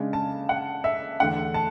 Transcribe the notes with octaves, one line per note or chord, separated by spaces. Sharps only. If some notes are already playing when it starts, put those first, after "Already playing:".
Already playing: C#3 G#3 D4
A5
F#5
E5
E2 D3 A3 D4 F#5
A5